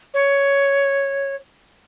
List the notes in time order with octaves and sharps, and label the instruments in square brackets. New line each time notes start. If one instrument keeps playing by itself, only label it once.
[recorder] C#5